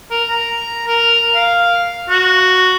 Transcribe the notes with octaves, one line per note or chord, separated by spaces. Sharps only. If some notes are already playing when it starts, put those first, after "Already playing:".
A#4
A#5
A#4
F5
F#4